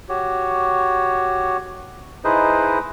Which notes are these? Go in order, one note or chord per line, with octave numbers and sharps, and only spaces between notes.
F#4 G4 C#5
D#4 E4 G#4 B4 C5 D#5